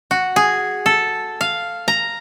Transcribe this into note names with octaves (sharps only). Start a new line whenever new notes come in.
F#4
G#4
A4
F5
A#5